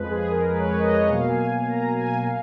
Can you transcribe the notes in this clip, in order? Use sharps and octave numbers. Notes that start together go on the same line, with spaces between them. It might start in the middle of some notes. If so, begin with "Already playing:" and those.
Already playing: F2 F3 G#3 B4
G#4
A#4
B4
C#5
B4
D#5
C#5
D#5
B2 F#3 A#3 F5
G#5
A#5
G#5
F5